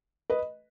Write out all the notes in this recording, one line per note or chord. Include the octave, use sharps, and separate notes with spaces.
B4 D#5